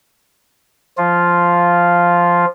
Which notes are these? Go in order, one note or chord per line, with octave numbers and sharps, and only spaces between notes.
F3 F4